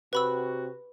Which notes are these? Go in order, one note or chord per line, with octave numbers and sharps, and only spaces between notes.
C3 F#4 B4 B5 E6